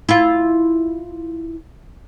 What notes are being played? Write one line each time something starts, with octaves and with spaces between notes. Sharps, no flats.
E4 F4